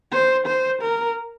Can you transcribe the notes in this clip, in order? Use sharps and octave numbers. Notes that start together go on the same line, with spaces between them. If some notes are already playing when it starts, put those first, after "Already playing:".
C5
C5
A#4